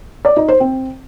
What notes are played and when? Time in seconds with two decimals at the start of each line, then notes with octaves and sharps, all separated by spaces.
0.25 D5
0.37 D#4
0.48 C5
0.60 C4